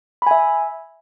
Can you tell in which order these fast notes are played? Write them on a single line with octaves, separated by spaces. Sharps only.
B5 G#5 E5